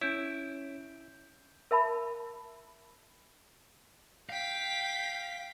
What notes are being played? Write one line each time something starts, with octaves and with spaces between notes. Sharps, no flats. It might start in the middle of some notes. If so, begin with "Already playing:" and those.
C#4 E4 C#5 G6 D7
A#4 E5 A5 B5
F5 G5 B6